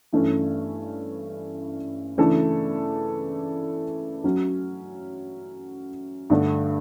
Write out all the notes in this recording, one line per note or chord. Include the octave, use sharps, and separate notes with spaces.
G2 E3 A3 C#4
C#3 E3 A3 D4 A4
F#3 C#4 F#4
G2 D3 A3 D4